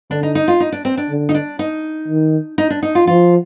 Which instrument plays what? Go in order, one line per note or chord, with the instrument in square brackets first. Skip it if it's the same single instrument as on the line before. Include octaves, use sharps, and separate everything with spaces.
[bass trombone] D3 [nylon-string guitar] D4
[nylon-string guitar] D#4
D#4
F4
D#4
D4
C4
D4
[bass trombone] D3
[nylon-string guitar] D#4
D4
D#4
[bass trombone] D#3
[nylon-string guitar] D#4
D4
D#4
F4
[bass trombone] F3 [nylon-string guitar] F4